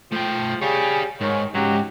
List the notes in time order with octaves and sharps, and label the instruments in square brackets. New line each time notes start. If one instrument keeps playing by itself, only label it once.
[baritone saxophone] F3 [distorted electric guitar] A3 G5
[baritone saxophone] G3 [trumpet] G#4 [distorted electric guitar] C#5 F5
[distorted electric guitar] G#2 [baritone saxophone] D#3 [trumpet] C#5
[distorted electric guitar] C#2 G#2 [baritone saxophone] F#3 [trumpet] G4